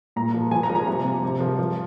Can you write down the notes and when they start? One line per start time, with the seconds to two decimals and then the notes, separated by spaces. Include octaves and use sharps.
0.16 A#2 A#5
0.34 F3
0.51 F3 G#5
0.63 A#5
0.70 F3
0.75 A#5
0.87 C3 A#5
1.05 C3
1.23 C3
1.40 F3
1.59 F3